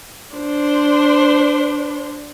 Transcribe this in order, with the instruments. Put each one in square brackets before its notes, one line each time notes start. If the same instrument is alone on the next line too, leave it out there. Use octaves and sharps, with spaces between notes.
[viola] D4 C5